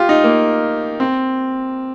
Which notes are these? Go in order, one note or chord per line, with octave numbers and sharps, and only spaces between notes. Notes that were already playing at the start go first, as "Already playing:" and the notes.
Already playing: F4 G4
D#4
A#3
C4